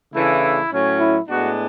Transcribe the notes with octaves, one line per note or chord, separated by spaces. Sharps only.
C#3 E3 A3 D4 E4
A2 F#3 C#4
E4
A2 G#3 B3 D4 F#4